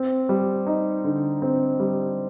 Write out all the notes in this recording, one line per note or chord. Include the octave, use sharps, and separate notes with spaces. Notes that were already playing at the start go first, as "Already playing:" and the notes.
Already playing: C4
G3
D#4
D3
C4
G3